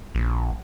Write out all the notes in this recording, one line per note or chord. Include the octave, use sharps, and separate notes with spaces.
A#1